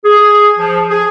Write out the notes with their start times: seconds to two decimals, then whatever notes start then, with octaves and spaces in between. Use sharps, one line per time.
0.05 G#4
0.59 F3
0.91 G#4